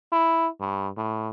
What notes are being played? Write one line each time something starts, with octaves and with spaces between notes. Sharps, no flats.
E4
G2
A2